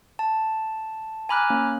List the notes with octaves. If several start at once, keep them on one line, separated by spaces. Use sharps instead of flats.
A5
G#5 A#5 B5 D6 F6 F#6
A#3 C#4